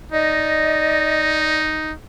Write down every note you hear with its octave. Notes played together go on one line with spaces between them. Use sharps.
D#4 D5 D#5